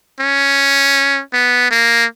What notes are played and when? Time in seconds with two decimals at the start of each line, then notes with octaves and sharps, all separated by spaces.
0.20 C#4
1.33 B3
1.71 A#3